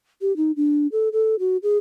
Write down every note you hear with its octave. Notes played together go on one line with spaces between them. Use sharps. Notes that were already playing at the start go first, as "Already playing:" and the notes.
G4
D#4
D4
A4
A4
F#4
G#4